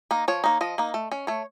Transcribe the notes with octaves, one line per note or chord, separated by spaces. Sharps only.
A#3 D#4
F3 C#5
A#3 D#4
F3 D#5
A#3 D#4
A3
C#4
A3 C#5